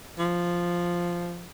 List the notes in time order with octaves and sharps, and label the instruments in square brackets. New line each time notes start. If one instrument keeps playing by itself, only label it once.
[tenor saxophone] F3